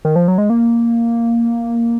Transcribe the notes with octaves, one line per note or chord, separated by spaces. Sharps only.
D#3
F3
F#3
G#3
A#3